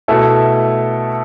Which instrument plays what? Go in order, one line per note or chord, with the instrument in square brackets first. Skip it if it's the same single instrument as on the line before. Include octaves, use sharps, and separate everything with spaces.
[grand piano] B2 A3 E4 A4